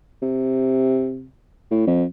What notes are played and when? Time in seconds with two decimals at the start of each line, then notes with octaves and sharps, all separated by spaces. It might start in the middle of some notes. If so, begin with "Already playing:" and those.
0.22 C3
1.71 A2
1.87 F2